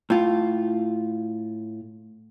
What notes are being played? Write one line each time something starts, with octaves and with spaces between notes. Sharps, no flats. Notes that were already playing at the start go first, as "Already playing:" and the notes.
A2 F4